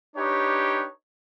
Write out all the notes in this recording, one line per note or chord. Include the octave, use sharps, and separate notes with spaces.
D4 D#4 G4 B4 C#5